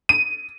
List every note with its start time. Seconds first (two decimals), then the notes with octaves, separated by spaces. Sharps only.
0.09 D#7